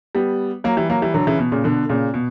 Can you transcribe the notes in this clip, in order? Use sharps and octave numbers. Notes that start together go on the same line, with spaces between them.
G3 B3
F#3 A#3
E3 G3
F#3 A#3
E3 G3
D3 F#3
C#3 E3
B2
A#2 C#3
B2 D3
A#2 C#3
B2